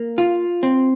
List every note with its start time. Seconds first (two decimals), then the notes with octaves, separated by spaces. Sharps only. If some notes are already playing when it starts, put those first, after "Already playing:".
Already playing: A#3
0.18 F4
0.63 C4